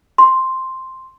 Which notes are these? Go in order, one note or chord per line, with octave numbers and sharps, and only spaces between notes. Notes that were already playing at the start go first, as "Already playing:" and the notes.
C6